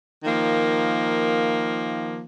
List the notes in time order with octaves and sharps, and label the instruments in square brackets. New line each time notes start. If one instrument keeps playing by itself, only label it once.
[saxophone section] D#3 F3 A#3